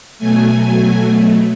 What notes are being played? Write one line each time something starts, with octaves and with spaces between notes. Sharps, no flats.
B2 F#3 A3 G#5
G#5